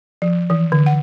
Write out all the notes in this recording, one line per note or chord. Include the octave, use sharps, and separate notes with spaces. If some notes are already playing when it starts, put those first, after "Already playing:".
F3
E3
D3
F#5